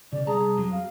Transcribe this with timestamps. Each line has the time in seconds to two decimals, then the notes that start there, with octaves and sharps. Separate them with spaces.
0.13 C#3 D5
0.27 C2 G#4 A5 A#5
0.57 F2 F#3
0.72 F5